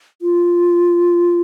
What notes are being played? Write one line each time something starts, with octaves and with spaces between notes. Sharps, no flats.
F4